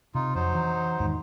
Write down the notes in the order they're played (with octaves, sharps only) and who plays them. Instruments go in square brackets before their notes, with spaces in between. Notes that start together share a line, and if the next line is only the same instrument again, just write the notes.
[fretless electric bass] C3 [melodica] D#4 F4
[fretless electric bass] F2 [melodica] F#3 D#4 C5
[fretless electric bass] E3
E2 G#2 D#3